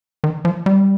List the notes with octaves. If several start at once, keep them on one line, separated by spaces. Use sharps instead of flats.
D#3
F3
G3